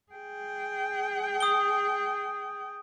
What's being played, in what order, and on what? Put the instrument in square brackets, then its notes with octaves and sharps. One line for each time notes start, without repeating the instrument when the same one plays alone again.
[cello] G#4 G5
[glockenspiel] D#6 G7